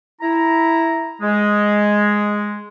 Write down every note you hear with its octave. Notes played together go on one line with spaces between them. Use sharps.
E4 A#5
G#3